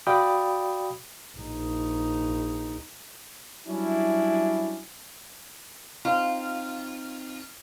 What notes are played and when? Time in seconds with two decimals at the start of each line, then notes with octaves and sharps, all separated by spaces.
0.07 F#4 D5 F5 G5 B5 D#6
1.37 A#1 D#4
3.67 F#3 G3 C#4 D4 E4
6.05 C4 D#4 F4 F5